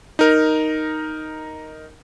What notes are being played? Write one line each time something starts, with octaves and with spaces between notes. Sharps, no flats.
D#4 A#4